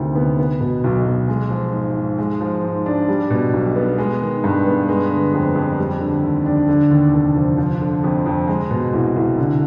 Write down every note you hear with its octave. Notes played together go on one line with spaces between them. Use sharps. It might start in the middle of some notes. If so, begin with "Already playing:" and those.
Already playing: D2 C3 D#3
B3
B3
B2
B1
B1
G#3
F3
G#2
G#2
G#3
F3
G#2
D4
G3
B2
B1
B3
G#3
D#3
G2
B3
G#3
D3
F2
F2
G3
D3
D#2
D4
D3
D#2
F1
F3
F3
D3
F2
F2
G#3
B2
C2
C2
D3